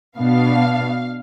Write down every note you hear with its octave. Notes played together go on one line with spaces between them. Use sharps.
B2 B3 D4 F5